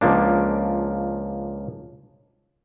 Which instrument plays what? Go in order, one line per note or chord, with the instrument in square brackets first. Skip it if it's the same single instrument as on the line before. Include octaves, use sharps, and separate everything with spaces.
[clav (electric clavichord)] C#2 F3 A#3 D4